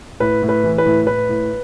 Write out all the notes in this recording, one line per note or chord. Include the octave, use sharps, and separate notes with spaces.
A2 B4
A2
B4
E3
B4
A2
A2 B4
A2